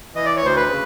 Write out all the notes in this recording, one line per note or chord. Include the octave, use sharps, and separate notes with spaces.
E3 D#5
D5
C#5
D2 C5
B4
C#3